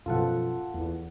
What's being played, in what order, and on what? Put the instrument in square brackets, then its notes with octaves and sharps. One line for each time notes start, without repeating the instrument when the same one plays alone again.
[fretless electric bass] F#2 B2 F3 [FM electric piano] F4 A4 F#5
[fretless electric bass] E2